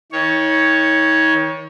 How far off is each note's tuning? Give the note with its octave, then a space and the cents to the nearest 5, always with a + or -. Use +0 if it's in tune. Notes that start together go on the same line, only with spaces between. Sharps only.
D#3 +40 C#5 +0